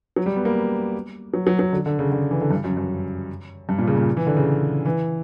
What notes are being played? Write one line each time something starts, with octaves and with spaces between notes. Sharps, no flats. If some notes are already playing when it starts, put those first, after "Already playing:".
F#3
G3
B3
A#3
F#3
F#3
F#3
D3
D3
C#3
D3
E3
D3
G2
F#2
F#2
G2
A#2
C#3
A#2
E3
D3
C#3
E3